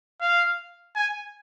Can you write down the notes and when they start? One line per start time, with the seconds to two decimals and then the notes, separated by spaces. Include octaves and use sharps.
0.21 F5
0.96 G#5